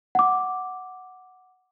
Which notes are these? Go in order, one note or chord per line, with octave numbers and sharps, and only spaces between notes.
F#5 D6